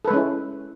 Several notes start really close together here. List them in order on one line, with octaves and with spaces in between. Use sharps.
A4 B4 G#3 C#4 E4